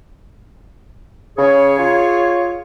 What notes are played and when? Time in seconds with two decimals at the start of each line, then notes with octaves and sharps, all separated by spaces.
1.38 C#3 G#4 C#5
1.78 F4